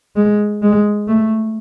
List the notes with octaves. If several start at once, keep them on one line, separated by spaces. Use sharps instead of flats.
G#3
G#3
A3